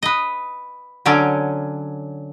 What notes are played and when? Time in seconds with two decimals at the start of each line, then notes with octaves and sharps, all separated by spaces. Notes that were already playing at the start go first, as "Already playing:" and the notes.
0.03 B4 D#5
1.06 D3 F#3 C#4 D5